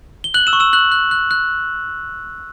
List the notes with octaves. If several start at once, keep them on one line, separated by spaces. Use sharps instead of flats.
G7
F#6 F#7
E6 E7
C#6
E6 E7
F#6 F#7
F#6
F#6
F#6